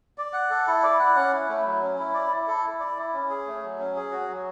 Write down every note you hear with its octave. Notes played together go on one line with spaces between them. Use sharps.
D5
F#5
A4
E4
D5
F#5
C#4
E4
A3
F#3
C#4
E4
D5
E4
A4
E4
D5
E4
C#4
G#4
A3
F#3
C#4
G#4
F#4
F#3